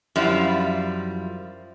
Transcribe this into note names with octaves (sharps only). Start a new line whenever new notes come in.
F#2 F3 G3 E4 F4